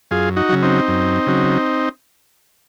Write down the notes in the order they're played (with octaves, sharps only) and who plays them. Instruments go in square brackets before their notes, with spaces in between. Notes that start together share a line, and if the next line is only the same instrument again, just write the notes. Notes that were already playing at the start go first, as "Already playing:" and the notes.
[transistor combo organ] F#2 F4 G#4
D#4 F#4
C#3 F#3
C4 D#4
F#2
C#3 F#3